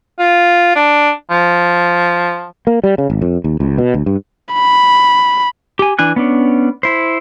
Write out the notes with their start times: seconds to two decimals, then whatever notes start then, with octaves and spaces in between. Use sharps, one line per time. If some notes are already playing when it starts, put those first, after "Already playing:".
0.19 F4
0.76 D4
1.30 F3
2.67 A#3
2.84 G3
2.98 C#3
3.10 G#1
3.21 F2
3.44 D#2
3.60 C#2
3.78 B2
3.94 D2
4.06 G2
4.54 B5
5.79 G4 G#5
5.99 E3 D4 G#5 F#6
6.16 B3 C#4 D4
6.83 E4 C5